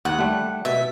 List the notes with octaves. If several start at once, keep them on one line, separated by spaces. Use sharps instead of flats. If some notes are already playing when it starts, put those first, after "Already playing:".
D#2 F#5
G3 A3
B2 E5